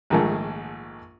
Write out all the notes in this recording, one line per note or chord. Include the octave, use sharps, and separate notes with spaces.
A#1 G#2 D#3 F3 G#3 A3